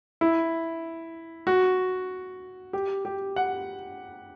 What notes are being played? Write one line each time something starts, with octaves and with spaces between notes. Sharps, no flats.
E4
F#4
G4
G4
F#5